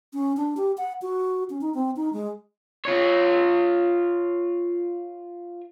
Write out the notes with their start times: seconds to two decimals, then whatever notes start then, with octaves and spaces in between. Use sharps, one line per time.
0.13 C#4
0.37 D4
0.57 G4
0.78 F#5
1.02 F#4
1.50 C#4
1.61 D#4
1.74 C4
1.96 D#4
2.13 G#3
2.85 F4 C#5